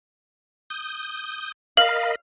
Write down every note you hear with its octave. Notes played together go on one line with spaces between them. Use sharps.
D#6 G6
A#4 D#5 F5 B5 F#7